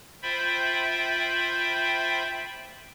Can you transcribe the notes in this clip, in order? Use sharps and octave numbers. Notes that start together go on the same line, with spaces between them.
F4 C5 E5 G5 B5